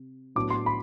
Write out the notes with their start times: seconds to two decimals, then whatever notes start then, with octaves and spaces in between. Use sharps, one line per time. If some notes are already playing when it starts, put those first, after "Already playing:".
Already playing: C3
0.35 A2 F#3 B3 D4 D6
0.50 C6
0.66 B5